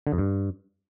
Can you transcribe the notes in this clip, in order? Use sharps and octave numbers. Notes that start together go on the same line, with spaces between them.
D3
F2
G2